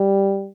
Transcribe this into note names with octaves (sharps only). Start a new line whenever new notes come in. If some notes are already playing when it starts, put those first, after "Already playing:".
Already playing: G3